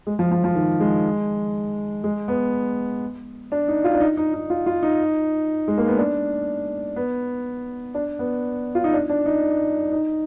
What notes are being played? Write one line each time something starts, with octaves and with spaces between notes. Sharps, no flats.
G#3
F3
F3
F3
D#3
G#3
G#3
B3
D4
D#4
F4
D4
D#4
D#4
D#4
F4
F4
D#4
G#3
A#3
B3
D4
B3
D4
B3
F4
D#4
D4
D4
D#4
D#4